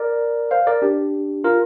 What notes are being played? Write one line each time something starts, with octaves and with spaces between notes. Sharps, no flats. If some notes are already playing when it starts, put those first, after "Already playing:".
Already playing: A#4 D5
C5 F5
A#4 D5
D4 G4
F4 A#4